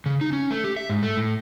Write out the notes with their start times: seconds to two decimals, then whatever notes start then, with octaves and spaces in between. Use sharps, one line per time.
0.06 C#3
0.21 D#4
0.33 C#4
0.51 A3
0.64 G4
0.77 E5
0.90 G#2
1.03 A3
1.17 A2